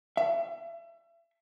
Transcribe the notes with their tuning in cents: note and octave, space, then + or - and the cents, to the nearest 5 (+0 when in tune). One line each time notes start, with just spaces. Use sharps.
E5 +35